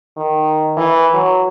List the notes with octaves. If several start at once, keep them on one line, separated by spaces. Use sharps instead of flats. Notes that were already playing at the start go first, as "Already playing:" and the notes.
D#3
E3
F#3